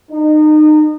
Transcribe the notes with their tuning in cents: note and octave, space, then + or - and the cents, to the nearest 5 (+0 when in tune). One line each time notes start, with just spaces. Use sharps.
D#4 -30